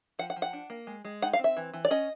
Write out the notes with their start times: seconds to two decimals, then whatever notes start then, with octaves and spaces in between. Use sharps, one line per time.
0.19 F3 F#5
0.30 F#5
0.36 F3
0.42 F#5
0.53 D4
0.70 A#3
0.87 G#3
1.05 G#3
1.22 D#4 F#5
1.33 F5
1.39 C4 E5
1.57 E3
1.73 E3
1.85 D5
1.91 C#4 D#5